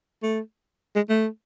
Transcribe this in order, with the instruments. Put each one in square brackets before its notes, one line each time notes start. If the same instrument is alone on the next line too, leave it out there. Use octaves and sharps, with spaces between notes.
[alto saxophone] A3
G#3
A3